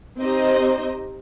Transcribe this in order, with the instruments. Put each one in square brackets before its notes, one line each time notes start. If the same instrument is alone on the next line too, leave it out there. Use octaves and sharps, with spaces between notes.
[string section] C4 D#4 G4 C5 D#5